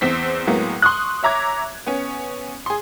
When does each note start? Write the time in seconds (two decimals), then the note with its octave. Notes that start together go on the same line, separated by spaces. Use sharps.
0.01 E2 C4 B6
0.47 A2 F#3 G#3 A#3 B3
0.82 C6 C#6 D#6 F#6
1.23 C#5 E5 A#5 D6 G#6
1.86 B3 C#4
2.66 G#4 C6